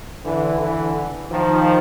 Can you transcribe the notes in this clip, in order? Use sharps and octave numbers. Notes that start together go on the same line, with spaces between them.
D3 E3
D3 E3
D#3 F3